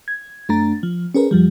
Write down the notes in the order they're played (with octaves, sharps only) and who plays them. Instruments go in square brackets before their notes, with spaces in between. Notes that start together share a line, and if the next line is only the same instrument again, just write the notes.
[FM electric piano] G#6
F#2 A3 D4 A#5 A6
F3
C#4 G#4 A#4 B4
F#2 F3 G3